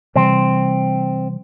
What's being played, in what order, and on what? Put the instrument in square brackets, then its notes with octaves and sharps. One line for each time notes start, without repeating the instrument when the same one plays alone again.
[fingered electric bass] C3 E3 G3 [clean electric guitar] C4